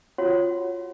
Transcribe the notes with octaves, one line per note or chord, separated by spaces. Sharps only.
F4 F#4 C#5 F#5